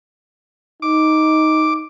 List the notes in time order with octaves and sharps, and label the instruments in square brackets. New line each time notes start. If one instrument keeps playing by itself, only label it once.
[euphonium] D#4 [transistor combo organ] D6